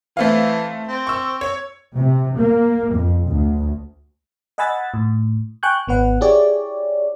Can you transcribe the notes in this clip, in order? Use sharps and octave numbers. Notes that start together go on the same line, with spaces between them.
E3 A3 C4 F5
C4
C#6 E6
C#5
C3
A#3
F2
D2
D#5 F#5 G#5 B5 E6 A6
A2
G5 G#5 C#6 F#6 G6
G#1 B3 B4 F#5
E4 G4 G#4 C#5 D5